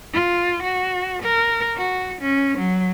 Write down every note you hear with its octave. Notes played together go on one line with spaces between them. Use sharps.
F4
F#4
A#4
F#4
C#4
F#3